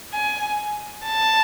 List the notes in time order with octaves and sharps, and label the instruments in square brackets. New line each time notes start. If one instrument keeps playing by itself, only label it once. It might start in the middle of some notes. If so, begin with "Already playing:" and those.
[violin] G#5
A5